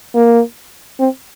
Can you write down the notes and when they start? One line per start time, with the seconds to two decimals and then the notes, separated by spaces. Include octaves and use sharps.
0.15 A#3
1.00 C4